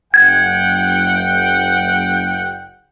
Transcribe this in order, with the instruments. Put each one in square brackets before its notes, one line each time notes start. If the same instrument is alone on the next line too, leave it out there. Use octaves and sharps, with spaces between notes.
[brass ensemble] F#1 F#5 G5 [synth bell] G#6